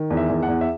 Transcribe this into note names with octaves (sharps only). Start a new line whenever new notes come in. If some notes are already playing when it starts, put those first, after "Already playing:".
Already playing: D#3
E2
E5
E2
F#5
E2
E5